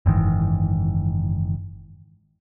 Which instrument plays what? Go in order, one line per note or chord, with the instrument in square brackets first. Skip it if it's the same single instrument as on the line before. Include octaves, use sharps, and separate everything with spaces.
[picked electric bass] F#1 G#2 D#3 E3